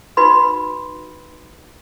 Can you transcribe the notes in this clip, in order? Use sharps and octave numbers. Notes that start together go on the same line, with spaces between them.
D#4 F#4 B4 B5 C6